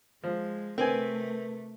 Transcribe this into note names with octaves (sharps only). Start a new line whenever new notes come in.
F3 G#3
C3 A3 C4 A#4 B4 G#5